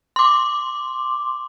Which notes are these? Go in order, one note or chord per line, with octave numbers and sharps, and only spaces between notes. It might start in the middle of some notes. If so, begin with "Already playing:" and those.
C6 D6